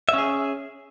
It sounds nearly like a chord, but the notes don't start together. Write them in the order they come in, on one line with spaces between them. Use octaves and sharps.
E5 C#4 G#4